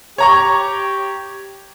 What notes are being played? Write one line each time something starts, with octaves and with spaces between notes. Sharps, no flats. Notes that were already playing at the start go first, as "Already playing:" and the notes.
G4 C#5 A#5 C#6